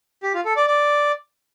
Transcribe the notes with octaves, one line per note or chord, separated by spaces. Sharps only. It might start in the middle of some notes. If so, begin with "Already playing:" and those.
G4
F4
A4
D5
D5